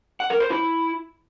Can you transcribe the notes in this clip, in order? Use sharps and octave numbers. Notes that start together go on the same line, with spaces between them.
F#5
A#4
C5
E4